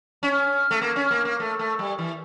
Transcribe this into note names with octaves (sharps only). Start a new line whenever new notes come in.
C#4
A3
A#3
C#4
A#3
A#3
A3
A3
G3
E3